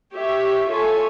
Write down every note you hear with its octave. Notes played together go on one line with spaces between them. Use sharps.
G4 C#5 E5
F4 A4 C#5 E5 G#5